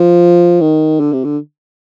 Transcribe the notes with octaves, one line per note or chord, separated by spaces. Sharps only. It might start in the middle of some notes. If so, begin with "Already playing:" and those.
Already playing: F3
D#3
D3
C3
D3